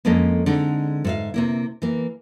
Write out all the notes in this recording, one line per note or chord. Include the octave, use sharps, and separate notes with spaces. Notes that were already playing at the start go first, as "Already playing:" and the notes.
F2 G#3 A#3 C#4 A4 D#5
D3 G#3 C4 D#4
G#2 E5 F5
C3 A#3 E4
E3 A#3